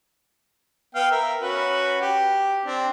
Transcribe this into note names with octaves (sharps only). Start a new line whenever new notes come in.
B3 F5 G5
A#4 E5
C#4 F#4 B4
G4
C4 D4